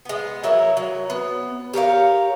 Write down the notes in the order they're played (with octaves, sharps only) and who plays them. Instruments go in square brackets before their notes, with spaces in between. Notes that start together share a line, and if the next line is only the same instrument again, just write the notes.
[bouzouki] G#3 B3
F#3 E4 A#4 C#5
F#3
B3
G4 A#4 C#5 F5